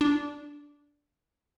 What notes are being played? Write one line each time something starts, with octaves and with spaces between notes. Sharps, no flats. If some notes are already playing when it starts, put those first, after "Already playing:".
D4